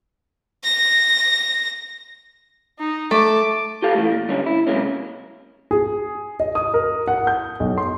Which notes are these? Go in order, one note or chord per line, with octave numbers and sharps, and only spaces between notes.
A#6
D#4
A3 A5 D6
F4 G4 A4 F5
E3 A3
A#2
D3 G3 A#3 C#4
E4
C3 F#3 G#3 A#3 C#4
G#4
D#5
D#6
A#4
F#5
G6
B1
C6